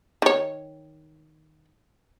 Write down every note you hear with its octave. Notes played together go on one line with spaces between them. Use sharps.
D#3 C#5